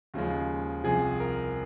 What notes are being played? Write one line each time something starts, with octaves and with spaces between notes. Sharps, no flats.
D#2 C#3 F3 G#3
C2 C3 F3 G#4
A#4